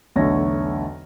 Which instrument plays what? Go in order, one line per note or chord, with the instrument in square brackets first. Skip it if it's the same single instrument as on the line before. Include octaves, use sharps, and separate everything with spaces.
[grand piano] B1 E2 D3 A3 C#5 A#6